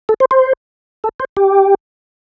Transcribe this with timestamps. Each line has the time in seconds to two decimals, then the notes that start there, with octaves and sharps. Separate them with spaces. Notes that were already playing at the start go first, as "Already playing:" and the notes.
0.09 A4
0.20 C5
0.31 C5
1.04 A4
1.20 C5
1.37 G4